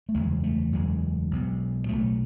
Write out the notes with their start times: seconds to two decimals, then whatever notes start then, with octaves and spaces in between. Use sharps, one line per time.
0.09 A3
0.15 F#1 E2 C#3 G#3
0.44 A3
0.73 F#1 E2 C#3 G#3
1.31 B1 B2
1.89 B1 B2 A3